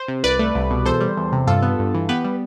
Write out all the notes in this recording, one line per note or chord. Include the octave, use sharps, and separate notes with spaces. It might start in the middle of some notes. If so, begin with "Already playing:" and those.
Already playing: C5
C3
C2 B4 D5
A3
C2
B2
E2 A4 C5
G3
E2
C3
G2 F4 A4
B3
G2
E3
B3 G4 B4
G3